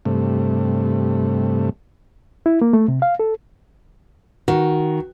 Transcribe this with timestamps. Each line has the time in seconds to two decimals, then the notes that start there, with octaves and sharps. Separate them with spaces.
0.05 G2 C3 A3
2.46 E4
2.62 A#3
2.73 A3
2.88 C3
3.02 F5
3.20 A4
4.48 D#3 F#4